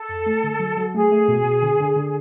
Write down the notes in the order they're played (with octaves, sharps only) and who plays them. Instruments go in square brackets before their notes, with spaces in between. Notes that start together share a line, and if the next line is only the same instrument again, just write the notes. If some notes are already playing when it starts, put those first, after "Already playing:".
Already playing: [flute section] A4
[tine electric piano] F2
A3
D3
F#3
F#3
[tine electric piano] A3 [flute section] G#4
[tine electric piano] A3
B2
B2
D3
D3
D3